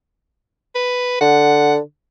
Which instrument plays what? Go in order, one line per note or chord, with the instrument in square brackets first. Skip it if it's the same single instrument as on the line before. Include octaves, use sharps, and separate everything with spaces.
[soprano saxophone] B4
[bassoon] D3 [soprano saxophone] F#5